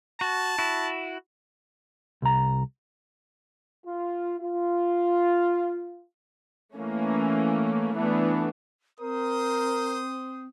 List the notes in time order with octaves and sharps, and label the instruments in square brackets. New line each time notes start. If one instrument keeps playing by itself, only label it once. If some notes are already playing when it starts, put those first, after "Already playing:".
[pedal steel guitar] F#4 [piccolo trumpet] A5
[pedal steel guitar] E4 F#4
[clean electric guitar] C2 A#5
[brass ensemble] F4
F4
[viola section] E3 A3 A#3 C#4
E3 A3 B3 D4
[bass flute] C4 [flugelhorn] A#4 [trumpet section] C5 D#6